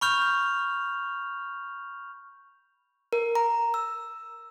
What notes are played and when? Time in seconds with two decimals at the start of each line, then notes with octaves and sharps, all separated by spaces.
0.01 B5 C#6 F6 G6 F7
3.13 A#4
3.35 A#5
3.74 E6